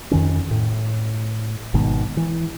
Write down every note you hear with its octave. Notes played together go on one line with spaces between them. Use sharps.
F2 D#3 C#4
A2
G#1 G#2 B2 D#3
E3